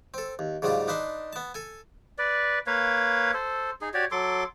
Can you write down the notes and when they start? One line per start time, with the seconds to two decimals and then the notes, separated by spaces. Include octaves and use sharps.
0.14 C4 A4
0.39 D#2
0.62 G#2 C#3 F#3 G3 F4
0.88 D4 D#4 B4 A5 C6
1.33 B3 A5
1.54 A4 G#5
2.19 B4 D5
2.67 A#3 B4 C#5 F5
3.34 A4 C5
3.81 D#4 G#4
3.94 F#4 G4 C#5 D5
4.12 F#3 A4 C6 D6